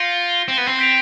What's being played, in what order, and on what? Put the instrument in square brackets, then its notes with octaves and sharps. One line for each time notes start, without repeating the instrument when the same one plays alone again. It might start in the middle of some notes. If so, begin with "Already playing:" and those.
Already playing: [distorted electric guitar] F4 [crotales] G6 A#6 C#7 F#7
[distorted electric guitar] C4
B3
C4
[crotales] G6 B6 D7 F7